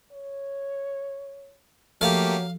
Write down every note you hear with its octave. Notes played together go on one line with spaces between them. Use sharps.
C#5
F3 F#3 A3 A#3 G4 A4 F5